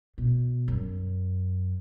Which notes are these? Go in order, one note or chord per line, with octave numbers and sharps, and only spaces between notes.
B2
F#2